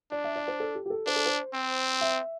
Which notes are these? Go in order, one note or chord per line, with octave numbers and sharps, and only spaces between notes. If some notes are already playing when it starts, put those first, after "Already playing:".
D4 D5
E5
D5
C5
A4
G4
G4
A4
D4 C5
A4
C5
C4
E5